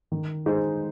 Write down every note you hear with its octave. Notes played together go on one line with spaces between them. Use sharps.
D#3
G#3 D#4 G#4 C5